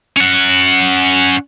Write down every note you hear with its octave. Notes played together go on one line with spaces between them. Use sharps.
C#4 F#5